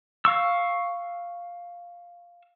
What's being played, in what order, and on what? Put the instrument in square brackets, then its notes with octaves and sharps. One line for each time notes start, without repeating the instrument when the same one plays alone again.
[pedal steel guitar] F5 C#6 E6